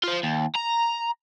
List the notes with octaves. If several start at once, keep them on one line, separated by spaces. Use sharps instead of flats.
F4 C5
D#2
A#5